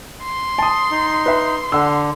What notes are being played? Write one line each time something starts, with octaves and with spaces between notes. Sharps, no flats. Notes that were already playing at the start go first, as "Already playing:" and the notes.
C6
A5 D#6
D#4
B4 E5
D3 F#5 E6